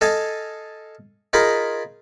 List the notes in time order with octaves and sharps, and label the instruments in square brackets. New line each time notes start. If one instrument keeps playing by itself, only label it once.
[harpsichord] A4 D#5 F5 G#5
D#4 F4 G#4 A#4 B5